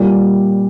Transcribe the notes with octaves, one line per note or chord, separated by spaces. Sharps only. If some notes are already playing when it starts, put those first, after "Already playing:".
Already playing: A#2 G3